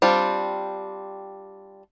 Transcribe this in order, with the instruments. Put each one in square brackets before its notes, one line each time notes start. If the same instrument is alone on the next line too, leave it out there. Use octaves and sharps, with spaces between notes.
[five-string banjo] G3 C4 D4 F4